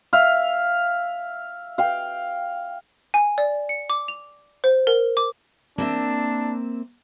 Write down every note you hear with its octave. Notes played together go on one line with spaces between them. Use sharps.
E5 F5
F5 G5
G#5
D5
C#7
D6
F7
C5
A#4
D6
A#3 C4 D4 E5